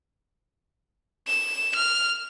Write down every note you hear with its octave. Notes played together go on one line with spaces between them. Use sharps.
E7
F6